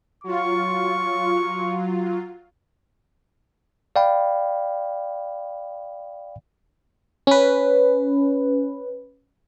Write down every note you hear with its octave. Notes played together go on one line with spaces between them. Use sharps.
F#3 F4 C#6
D5 F5 G5 B5
C#4 B4